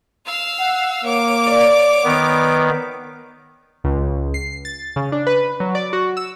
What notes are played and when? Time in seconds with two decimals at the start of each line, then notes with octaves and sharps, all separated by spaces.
0.25 F5 E6
0.60 F#5
1.04 A#3 C#5 D6
1.47 D5
2.04 D#3 B3 B4
3.84 C#2
4.34 C7
4.65 A6
4.96 C#3
5.12 D4
5.27 B4
5.60 F#3
5.75 D5
5.93 F#4
6.17 E6